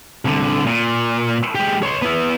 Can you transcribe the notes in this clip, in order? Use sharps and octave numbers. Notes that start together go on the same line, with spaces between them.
C2 D3
A#2
G#3 G4
C#5 C6
B3 E4